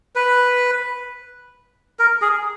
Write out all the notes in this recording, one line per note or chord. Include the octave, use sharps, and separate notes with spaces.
B4
A#4
G#4